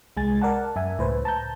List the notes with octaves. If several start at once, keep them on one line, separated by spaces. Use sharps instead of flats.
C2 G#3 G#5 A6
A#4 D5 F#5 A5
F#2 E5 G#5
C#2 A2 B4 C5
A5 A#5 G6